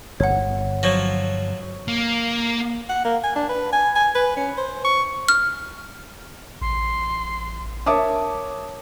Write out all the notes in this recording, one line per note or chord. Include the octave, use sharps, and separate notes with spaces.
G1 C#5 F#5
F3 F#3 C#5 A#6
A#3
F#5
A#3
G#5
D4
B4
G#5
G#5
B4
C#4
C5
C#6
F6
A1 C6
A#4 C#5 E5 A5 D6 D#6